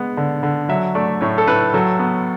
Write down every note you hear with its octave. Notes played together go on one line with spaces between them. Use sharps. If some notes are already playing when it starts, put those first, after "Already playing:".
Already playing: G#3 B3
D3
D3
F#3 E5
A3 D5
A2 C#5
A4
A2 B4
F#3 A4
B3